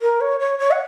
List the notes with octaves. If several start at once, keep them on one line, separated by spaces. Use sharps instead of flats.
A#4
C#5
C#5
C#5
F#5